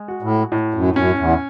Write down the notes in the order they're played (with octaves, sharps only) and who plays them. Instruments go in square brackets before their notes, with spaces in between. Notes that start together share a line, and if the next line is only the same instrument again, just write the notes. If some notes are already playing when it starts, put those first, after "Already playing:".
Already playing: [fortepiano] G#3
F#4
[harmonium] A2
[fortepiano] A2
[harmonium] F#2
[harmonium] F#2 [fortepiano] C#4
[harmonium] E2